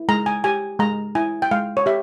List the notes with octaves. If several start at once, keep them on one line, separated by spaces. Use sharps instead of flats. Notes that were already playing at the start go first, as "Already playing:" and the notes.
Already playing: E4
G#3 A#5
G#5
G4 G#5
G#3 A#5
E4 G#5
G5
G#3 F5
C#5
G4 E5